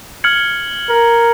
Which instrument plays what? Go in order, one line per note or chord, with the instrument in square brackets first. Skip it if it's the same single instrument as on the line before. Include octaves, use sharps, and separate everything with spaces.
[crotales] F6 G#6 C#7 F#7
[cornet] A#4